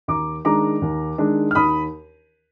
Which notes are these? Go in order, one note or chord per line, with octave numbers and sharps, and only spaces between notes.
D#2 A#5 D6
D#3 G#3 D4 A#5 D6
D#2
D#3 G#3 D4
F6
D#2 B5 D#6